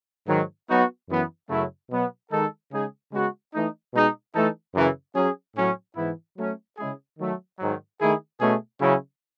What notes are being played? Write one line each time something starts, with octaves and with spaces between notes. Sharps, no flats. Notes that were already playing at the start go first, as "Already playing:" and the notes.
G#2 D#3 F#3
F#3 B3 D#4 F#4
F#2 E3 B3
F#2 C#3 F#3 A3 E4
B2 F#3 B3
D#3 G#3 D#4 A4
C#3 G#3 D#4 G#4
C#3 G#3 B3 F#4
E3 A3 D#4
B2 G#3 D#4 G#4
E3 A3 D#4 A4
F#2 C#3 E3
F#3 C#4 G#4
A2 F#3 C#4
G#2 E3 B3 E4
F#3 A3 C#4
C#3 G#3 C#4 E4 G#4
D#3 F#3 A3
G#2 D#3 F#3
D#3 A3 E4 G#4
B2 A3 C#4 G#4
C#3 F#3 C#4 E4